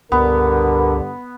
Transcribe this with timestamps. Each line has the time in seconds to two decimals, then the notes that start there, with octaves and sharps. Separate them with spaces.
0.12 C#2 G2 D3 B3 A#4